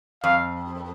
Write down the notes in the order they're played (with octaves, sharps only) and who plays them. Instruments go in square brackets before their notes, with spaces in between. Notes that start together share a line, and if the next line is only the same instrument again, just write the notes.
[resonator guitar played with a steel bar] F2 [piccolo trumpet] F5